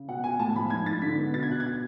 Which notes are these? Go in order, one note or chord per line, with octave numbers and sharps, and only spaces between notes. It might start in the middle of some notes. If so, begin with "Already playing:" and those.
Already playing: C#3
B2 F#5
B2 G#5
A2 A5
F3 B5
G#2 G#6
G#2 A6
D3 B6
B3
B2 A6
G#6
B2 F#6
G#6